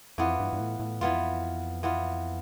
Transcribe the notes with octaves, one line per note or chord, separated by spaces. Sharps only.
F2 E3 B3 F4
G2
G2
A2
A2
F2 E3 B3 F4
E3 B3 F4